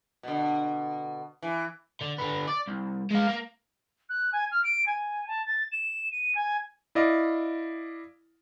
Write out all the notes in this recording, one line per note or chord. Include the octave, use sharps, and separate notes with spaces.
B2 D3
E3
D3
D3 B3
D5
C2
G#3 F5
A#3
F#6
G#5
F6
D7
G#5
A5
A6
E7
D#7
G#5
E4 D5 D#5 F5